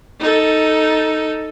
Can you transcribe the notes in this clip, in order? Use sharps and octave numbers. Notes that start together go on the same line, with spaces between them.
D#4 A4